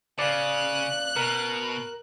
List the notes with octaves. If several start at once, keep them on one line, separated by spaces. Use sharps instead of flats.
C#3 D5 F5 F#6
B2 A#4